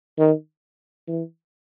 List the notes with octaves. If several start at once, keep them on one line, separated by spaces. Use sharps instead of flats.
D#3
E3